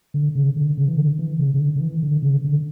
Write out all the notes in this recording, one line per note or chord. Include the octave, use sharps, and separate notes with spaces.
D3
C#3
D3
C#3
E3
D3
E3
C#3
C#3
D3
D3
E3
D3
C#3
D3